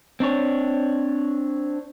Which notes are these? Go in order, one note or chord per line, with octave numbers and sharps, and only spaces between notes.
C4 D4 C#5